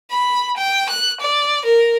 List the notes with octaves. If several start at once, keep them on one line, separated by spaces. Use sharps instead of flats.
B5
G5
F#6
D5
A#4